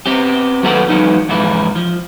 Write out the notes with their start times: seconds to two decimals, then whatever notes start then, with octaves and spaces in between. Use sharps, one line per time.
0.06 B3 C4 G4
0.63 D#2 F#3 A3 A#4 B4 F#5
0.89 E2 G#2 E3 F#3 B3 D#4
1.29 F2 G#2 C3 E3 E4
1.76 F3